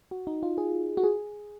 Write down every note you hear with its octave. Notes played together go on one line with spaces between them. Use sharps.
F#4
D#4
F4
G#4
F#4
G#4